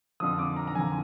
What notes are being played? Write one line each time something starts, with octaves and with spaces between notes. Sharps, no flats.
F2 D3 F3 D#6
D6
A#5
A#5
F2 D3 F3 G#5